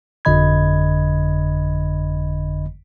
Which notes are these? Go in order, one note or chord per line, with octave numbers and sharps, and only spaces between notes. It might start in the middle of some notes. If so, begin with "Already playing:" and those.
G1 F2 D3 D#5 B5 G#6